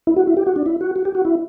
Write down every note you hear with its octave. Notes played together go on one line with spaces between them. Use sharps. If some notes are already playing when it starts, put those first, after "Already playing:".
E4
F#4
E4
G4
F#4
D4
E4
F#4
F#4
G4
F#4
E4